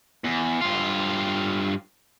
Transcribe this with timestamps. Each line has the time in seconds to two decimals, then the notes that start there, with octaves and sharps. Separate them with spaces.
0.24 E2
0.62 G2 F4